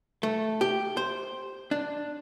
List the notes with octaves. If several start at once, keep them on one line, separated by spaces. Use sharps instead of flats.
A3
G4
C5
D4